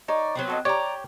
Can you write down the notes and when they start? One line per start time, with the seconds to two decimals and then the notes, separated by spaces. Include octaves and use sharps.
0.08 D#4 C#5 D5
0.35 F#3 B3 C4
0.47 F#4 A4 D#5
0.65 G4 C#5 D5 A#5